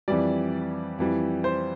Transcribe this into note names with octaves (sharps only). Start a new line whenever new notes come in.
F2 E3 G3 D5
F2 E3 G3
C5